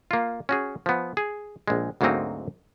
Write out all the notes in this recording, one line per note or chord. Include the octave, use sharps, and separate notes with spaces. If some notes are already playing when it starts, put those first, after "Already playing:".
A#3 F4
C#4 F#4 G#4
F3 B3
G#4
A#1 G#3
D2 G#2 F#3 A#3 C4 D#4